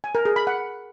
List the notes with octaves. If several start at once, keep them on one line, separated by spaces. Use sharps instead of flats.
G#5
A#4
G#4
B5
F#5